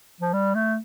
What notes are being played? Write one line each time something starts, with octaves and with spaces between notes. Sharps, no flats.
F3
G3
A3